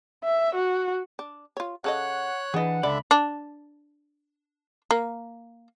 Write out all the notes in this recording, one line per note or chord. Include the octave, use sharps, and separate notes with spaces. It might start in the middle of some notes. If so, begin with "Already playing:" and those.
E5
F#4
D4
F4 C#5
C#3 A4 C#5 D#5 F#5 F#6
E3 D4 G#4 B4 D#5 F#5
C#2 D3 D4 D5 E5 B5
D4
A#3